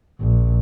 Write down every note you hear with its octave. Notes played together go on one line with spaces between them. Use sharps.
A#1